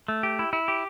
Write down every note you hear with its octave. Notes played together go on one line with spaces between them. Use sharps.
A3
G4
E4
E4
G4